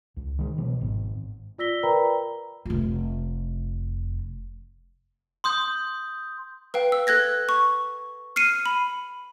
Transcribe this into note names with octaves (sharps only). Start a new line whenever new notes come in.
C#2
D#3 G#3
B2 E3 F#3 B3
G#1 G#2
F4 D5 E6 A#6 B6 G7
A#4 B4 D5 G5 A#5 B5
F1 F4
C6 D#6 G6
B4 F5 G5
E6
A4 F#6 G#6 A#6
C#6
F6 C7 C#7 D#7
B5